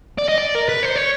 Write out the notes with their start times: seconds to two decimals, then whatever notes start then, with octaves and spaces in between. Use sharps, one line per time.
0.19 D5
0.29 D#5
0.38 D5
0.55 A#4
0.69 B4
0.83 C5
0.96 C#5